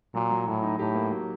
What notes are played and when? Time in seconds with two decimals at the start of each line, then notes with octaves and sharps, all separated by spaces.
0.14 A#2 F#3
0.31 F#3
0.47 A2 F#3
0.62 D#4
0.79 A2 G4
0.95 A#3
1.11 F#3